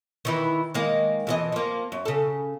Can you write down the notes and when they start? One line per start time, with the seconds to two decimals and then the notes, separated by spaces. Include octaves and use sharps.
0.25 D#3 E3 E4
0.74 D#3 G#3 A#3
1.27 F2 E3 D#5
1.52 F3 A#3
1.92 F#2
2.05 C#3 A4